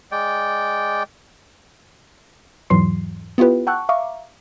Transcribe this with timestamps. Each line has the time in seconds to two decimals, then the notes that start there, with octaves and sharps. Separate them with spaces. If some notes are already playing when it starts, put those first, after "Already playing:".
0.12 G#3 D5 G5
2.70 E2 G#2 E3 F#3 C6 C7
3.38 B3 E4 F4 G4 B4
3.67 F#5 G5 A5 C#6 E6 F#6
3.89 E5 F5 A#5 C#6 D6